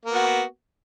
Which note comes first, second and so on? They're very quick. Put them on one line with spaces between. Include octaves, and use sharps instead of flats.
A#3 B3 F#4